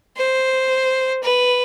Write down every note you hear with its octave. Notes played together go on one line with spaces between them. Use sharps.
C5
B4